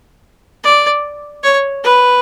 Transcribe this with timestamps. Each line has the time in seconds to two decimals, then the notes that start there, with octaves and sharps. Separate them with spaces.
0.64 D5
1.44 C#5
1.84 B4